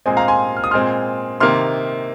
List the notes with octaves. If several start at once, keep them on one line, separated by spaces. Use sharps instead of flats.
A#2 G#3 C4 D#5 G#5
F5 A#5
G#5 C6
F6
D#6
A#2 G#3 C4 C6 F6
C3 D#3 A#3 C6 F6